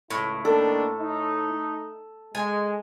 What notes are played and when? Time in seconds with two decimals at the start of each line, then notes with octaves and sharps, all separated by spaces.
0.10 C#2 A2 E4
0.45 D#3 A#3 D4 A4
1.00 A3 D#4
2.35 G#3 G#5